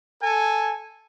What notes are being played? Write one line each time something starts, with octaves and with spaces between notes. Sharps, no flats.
A4 G#5